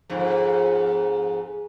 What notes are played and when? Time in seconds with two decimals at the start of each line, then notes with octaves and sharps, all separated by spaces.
0.10 F2 G#2